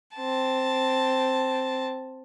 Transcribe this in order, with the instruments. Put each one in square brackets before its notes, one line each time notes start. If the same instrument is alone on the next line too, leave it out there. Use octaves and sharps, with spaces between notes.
[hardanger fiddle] C4 A5